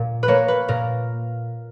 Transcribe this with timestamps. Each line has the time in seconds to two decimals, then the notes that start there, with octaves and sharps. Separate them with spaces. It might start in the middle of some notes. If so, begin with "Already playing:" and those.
Already playing: A#2
0.23 B4
0.28 A#3 C#5
0.48 B4
0.68 A#2 A#4